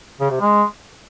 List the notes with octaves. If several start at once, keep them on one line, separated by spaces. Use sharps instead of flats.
C#3
C3
G#3